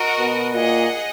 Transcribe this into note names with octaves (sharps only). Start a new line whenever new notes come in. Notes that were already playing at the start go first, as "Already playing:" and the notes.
Already playing: F#4 A#4 D#5 F#5
B2
A#2 G#4 D#5 F#5